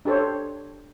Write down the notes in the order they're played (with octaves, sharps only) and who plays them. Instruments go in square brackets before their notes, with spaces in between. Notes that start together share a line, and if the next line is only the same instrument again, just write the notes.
[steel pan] D4 G4 A4 C5 C#5